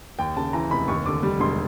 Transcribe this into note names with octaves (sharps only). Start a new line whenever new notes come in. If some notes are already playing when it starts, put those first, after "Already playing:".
D#2 G5
C#3 A5
E3 A#5
F1 B5
D#2 C#6
D3 D6
G3
E1 C6